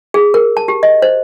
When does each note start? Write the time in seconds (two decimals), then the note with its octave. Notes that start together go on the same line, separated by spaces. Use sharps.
0.14 G#4
0.34 A#4
0.57 A5
0.68 G4
0.83 D#5
1.02 C5